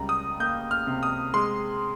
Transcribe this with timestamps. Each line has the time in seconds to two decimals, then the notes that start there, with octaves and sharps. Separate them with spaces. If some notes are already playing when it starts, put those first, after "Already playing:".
Already playing: C#2 G3 A#5
0.09 D#6
0.40 A#3 G6
0.71 F6
0.87 C3
1.03 D#6
1.34 G#3 C6